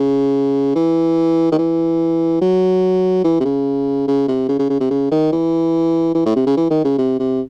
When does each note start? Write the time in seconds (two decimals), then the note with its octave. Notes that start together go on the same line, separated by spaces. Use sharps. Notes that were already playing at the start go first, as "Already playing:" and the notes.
Already playing: C#3
0.75 E3
1.52 D#3
1.58 E3
2.41 F#3
3.24 E3
3.40 C3
3.45 C#3
4.07 C#3
4.28 C3
4.49 C#3
4.59 C#3
4.69 C#3
4.80 C3
4.90 C#3
5.11 D#3
5.32 E3
6.15 E3
6.25 A2
6.35 C3
6.46 C#3
6.57 E3
6.70 D#3
6.84 C#3
6.98 C3
7.19 C3